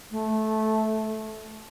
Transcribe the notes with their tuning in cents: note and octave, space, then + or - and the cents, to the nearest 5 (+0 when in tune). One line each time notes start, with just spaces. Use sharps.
A3 -15